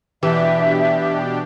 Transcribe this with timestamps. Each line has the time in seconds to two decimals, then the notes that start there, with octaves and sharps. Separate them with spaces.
0.23 B2 E3 D4 G4 E5